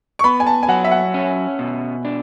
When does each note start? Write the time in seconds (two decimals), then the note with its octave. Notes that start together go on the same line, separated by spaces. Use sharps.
0.19 C#6
0.24 B3 B5
0.40 G#5
0.47 A5
0.63 G#5
0.69 F#3 F#5
0.84 E5
0.91 F#5
1.14 C#4
1.59 B2
2.05 D4